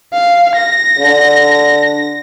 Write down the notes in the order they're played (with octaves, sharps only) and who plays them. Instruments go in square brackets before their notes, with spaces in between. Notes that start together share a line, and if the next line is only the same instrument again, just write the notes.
[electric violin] F5
A#6
[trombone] D3